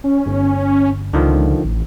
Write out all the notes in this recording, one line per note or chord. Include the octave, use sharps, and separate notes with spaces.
C#4
G1
C#2 D3 D#3 F3
A1